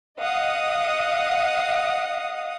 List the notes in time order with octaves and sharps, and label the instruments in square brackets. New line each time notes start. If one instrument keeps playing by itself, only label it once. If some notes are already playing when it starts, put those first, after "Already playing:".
[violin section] D#5 F5 F#5 D#6